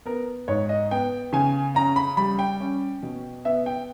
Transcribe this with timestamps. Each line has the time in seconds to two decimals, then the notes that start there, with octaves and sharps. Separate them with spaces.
0.06 B3 A#4
0.48 G#2 C#5
0.69 D#5
0.91 B3 G5
1.33 C#3 G#5
1.75 C#4 A#5
1.96 B5
2.17 G3 B5
2.39 G5
2.60 C#4
3.03 B2
3.45 B3 E5
3.66 G5